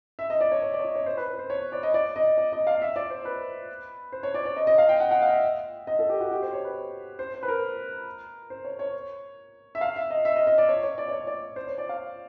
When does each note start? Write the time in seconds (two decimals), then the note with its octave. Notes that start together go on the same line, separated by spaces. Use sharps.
0.19 E5
0.30 D#5
0.41 D5
0.52 C#5
0.62 C#5
0.74 D5
0.79 C#5
0.85 D5
0.96 C#5
1.06 C5
1.17 B4
1.28 B4
1.39 C5
1.50 C#5
1.72 D5
1.83 D#5
1.94 D5
2.16 D#5
2.38 D5
2.53 D#5
2.67 F5
2.82 E5
2.96 D5
3.10 C5
3.25 B4
4.12 C5
4.23 C#5
4.34 D5
4.45 D5
4.56 D#5
4.67 D#5
4.78 F5
4.89 G5
5.00 F#5
5.11 F#5
5.22 F5
5.33 E5
5.87 D#5
5.99 A4
6.09 G4
6.20 F#4
6.31 G4
6.42 C5
6.53 C#5
6.64 B4
7.19 C5
7.34 C5
7.43 B4
7.48 A#4
8.50 C5
8.65 C#5
8.79 C#5
9.75 E5
9.81 F5
9.96 E5
10.10 D#5
10.25 E5
10.36 D#5
10.47 D#5
10.58 D5
10.69 C#5
10.83 C#5
10.98 D5
11.08 D5
11.12 C#5
11.27 D5
11.56 C5
11.67 C#5
11.78 D5
11.89 F5